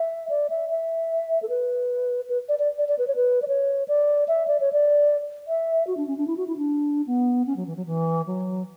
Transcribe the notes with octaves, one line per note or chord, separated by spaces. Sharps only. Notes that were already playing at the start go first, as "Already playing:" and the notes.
Already playing: E5
D5
E5
E5
A4
B4
B4
D5
D5
D5
D5
B4
C#5
B4
D5
C#5
D5
E5
D5
C#5
D5
E5
F#4
D4
C#4
D4
E4
F#4
E4
D4
B3
C#4
F#3
E3
F#3
E3
F#3